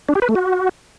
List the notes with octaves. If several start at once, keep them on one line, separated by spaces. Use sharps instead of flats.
D4
G4
B4
A3
F#4